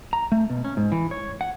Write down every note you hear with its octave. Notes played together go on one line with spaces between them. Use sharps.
A#5
A3
B2
C#4
G#2
E3
C#5
F#5